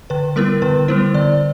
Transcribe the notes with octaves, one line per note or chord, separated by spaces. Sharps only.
D3 B4
G3 B3 E4 A#4
D3 B4
G3 B3 E4 C5
D3 D5